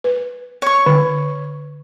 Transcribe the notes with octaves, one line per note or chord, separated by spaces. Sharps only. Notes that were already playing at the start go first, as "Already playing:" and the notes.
B4
C#5 C#6
D3